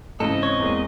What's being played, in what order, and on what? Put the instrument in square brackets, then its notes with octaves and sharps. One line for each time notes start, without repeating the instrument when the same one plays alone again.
[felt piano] G#2 C#3 E3 [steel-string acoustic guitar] C4 [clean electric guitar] A4 [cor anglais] D#5
[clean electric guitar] C#5
[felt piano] E2 G#3 A#3